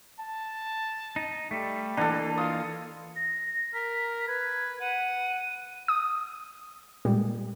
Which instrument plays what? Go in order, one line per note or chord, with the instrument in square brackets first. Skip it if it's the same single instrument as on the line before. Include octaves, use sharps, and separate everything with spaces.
[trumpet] A5
[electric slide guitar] D#4
[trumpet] G3 [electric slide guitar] A3
[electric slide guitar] E3 A#3 D#4 [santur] D4 A4
[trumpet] F4 [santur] D#6
[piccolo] A#6
[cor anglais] A#4 [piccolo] B6
[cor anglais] B4 [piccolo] G#6
[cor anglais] F#5 [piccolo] D#7
[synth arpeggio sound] D#6
A#2 G3 G#3